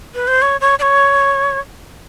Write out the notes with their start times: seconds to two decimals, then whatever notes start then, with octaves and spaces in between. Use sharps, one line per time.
0.15 B4
0.28 C5
0.42 C#5
0.61 C#5
0.79 D5
0.82 C#5